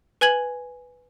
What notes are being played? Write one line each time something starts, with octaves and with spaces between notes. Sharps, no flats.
B4 G#5 G#6 F#7